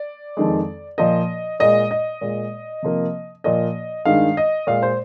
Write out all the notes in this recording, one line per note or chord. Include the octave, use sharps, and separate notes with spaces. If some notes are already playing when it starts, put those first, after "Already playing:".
Already playing: D5
F2 D#3 G#3
A#2 F3 A#3 D#5
A#2 G#3 D#5
D#5
A#2 G#3
C3 F3 A#3
A#2 F3 A#3 D#5
G2 D#3 G#3 F5
D#5
A#2 G#3 F5
C5